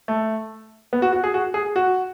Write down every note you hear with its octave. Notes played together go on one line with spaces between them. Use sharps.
A3
B3
F#4
F#4
G#4
F#4
G#4
F#4